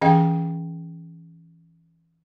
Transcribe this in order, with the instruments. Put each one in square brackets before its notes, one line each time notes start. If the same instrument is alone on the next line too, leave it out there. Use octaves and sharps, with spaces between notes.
[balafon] E3 C#4 G#4 D#5 F5 G5